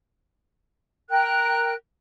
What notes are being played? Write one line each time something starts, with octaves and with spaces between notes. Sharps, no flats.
A#4 G5 F#6